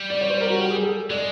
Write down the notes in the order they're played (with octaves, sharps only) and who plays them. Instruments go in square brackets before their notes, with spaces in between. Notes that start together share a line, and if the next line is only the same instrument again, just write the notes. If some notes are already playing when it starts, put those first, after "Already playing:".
Already playing: [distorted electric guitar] G3
[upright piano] D5
C#5
C5
A#4
F#4
G4
G#4
A4
[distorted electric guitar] G#3 [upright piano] D5